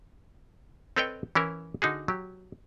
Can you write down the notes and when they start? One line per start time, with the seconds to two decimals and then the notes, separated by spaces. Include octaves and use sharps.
0.96 C4 A4 B4 C#5 D#5 G5
1.35 E3 C#4 E4 A#4
1.82 D3 D#4 F#4 G#4
2.08 F#3 G4